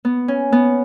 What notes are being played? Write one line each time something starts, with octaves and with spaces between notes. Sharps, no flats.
B3
C#4
B3